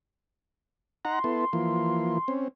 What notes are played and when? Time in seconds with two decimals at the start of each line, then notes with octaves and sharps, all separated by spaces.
1.05 D#4 F#5 A#5 C6
1.24 B3 E4 A4
1.53 E3 F3 A#3
2.28 C4 C#4